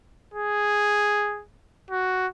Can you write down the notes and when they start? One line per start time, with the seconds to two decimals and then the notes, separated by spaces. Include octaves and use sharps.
0.34 G#4
1.91 F#4